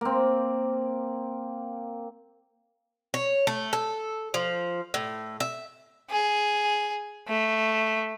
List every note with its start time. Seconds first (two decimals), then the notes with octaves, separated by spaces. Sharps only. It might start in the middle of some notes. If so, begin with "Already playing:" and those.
0.01 A#3 C4
3.14 C#5
3.47 A3
3.73 A4
4.34 F3
4.94 A2
5.40 E5
6.10 G#4
7.28 A3